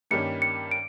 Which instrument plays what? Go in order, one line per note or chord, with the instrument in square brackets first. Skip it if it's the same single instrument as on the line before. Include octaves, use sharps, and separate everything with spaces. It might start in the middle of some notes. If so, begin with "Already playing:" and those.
[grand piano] G2 D#3 G3 A#3 C#4 [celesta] C#7
[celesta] C#7
D7